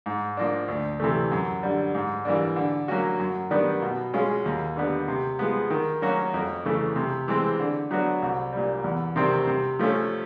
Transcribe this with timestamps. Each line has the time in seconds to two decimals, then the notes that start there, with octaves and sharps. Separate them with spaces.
0.06 G#2
0.37 F3 A#3 D4
0.68 D2
1.00 C3 E3 A3
1.32 F#2
1.63 D3 G3
1.95 G#2
2.25 E3 G3 A#3 D4
2.56 D3
2.88 F#3 A#3 C#4 F#4
3.20 F#2
3.51 D#3 G3 B3 D4
3.82 B2
4.14 G#3 C#4 F4 G#4
4.45 D#2
4.77 D3 G3 B3
5.08 C3
5.39 F3 G#3 B3
5.70 D#3
6.02 F#3 A#3 C#4 F#4
6.34 F2
6.65 C#3 E3 A3
6.96 C3
7.28 E3 G#3 C4
7.60 D3
7.91 F#3 B3 D4 F#4
8.22 C2
8.53 A#2 G3
8.84 E2
9.16 C3 D#3 G3 C4
9.47 C3
9.79 F3 A3 C#4